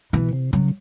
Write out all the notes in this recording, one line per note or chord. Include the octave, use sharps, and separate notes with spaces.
B2 E3
C3
C#3 F#3